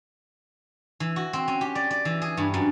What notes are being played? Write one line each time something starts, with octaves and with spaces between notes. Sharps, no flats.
E3
F#4
C4
C#4
G4
D5
D5
E3
G#4
G2
F#2